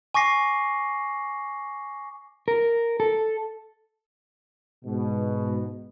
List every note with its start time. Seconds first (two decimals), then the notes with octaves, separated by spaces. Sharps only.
0.14 G#5 C#6 D6 A#6 C7
2.48 A#4
3.00 A4
4.85 G#2 B2